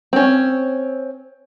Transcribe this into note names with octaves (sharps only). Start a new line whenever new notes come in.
C4 C#4